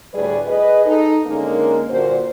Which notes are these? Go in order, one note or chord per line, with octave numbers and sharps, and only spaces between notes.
D2 A2 G3 G#4 B4 D5
G#4 B4 D#5
D#4 A4
D3 G#3 A#3 C#4 D#4 A#4
G2 A#2 D3 F#4 C5